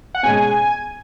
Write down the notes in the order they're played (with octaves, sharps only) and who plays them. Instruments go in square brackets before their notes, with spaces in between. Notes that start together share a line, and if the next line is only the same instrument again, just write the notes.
[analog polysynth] F#5
[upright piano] B2 G#3 C#4 [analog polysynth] G#5